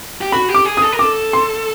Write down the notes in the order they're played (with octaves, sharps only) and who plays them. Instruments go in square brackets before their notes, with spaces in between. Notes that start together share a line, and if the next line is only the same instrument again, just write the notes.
[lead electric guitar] G4
[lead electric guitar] F#4 [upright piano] B5
[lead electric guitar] G4
[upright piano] D6
[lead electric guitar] G#4
[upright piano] D#6
[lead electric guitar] A4
A#4
[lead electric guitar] A4 [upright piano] D6
[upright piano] C6